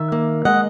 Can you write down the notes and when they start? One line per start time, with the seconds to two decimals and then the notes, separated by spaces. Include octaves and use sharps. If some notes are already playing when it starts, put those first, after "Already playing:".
Already playing: D#3 E5
0.12 A#3
0.45 G#3 D#5 F#5